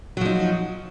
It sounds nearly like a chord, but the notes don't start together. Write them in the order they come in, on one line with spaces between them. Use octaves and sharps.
F#3 F3 D#4